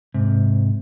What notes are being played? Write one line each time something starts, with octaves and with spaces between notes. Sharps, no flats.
G#2 C3